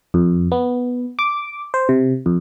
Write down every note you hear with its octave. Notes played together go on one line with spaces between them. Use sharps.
F2
B3
D6
C5
C3
F2